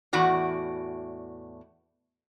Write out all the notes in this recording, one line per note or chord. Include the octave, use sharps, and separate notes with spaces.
E2 A2 F#4 D5